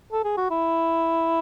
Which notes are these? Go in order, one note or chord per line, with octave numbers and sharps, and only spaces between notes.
A4
G#4
F#4
E4